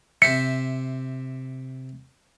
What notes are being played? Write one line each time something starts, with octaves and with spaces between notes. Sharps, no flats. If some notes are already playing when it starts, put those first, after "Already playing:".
C3 C5 E5 C#7